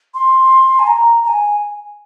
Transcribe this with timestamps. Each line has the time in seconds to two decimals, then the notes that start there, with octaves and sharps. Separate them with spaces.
0.14 C6
0.79 G#5
0.87 A#5
1.23 A#5
1.28 G#5